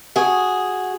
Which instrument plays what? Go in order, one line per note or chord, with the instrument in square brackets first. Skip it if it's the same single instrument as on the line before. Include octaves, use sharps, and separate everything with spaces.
[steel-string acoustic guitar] F#4 G#4